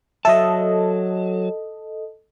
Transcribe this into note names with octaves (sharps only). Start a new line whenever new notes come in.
F#3 A4 D#5 E5 A5